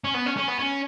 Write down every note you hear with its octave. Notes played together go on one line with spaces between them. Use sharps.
C#4
B3
C#4
C#4
B3
C#4